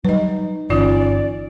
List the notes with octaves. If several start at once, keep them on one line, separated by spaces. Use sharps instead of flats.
F#3 G3 D#4 B4 D#5
G1 E3 C#4 D#4 F4 D5